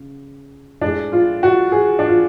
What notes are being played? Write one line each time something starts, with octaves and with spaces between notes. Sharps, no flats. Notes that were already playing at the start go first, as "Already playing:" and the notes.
Already playing: C#3
A2 G#3 D4
F4
F#4
G#4
D4
F4